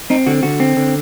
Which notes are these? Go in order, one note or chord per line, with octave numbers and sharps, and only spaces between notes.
C4 D#4
D3 F#4
D3 F#4
C4
D3